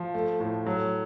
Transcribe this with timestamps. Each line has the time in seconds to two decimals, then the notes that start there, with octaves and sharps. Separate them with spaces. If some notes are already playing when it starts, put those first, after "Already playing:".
Already playing: F3
0.14 A3
0.40 A2
0.66 F#3